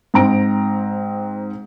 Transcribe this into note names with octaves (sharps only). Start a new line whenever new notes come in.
G#2 C4 A#5 D7